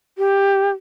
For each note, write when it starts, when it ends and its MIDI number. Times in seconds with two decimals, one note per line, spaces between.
0.18 0.71 67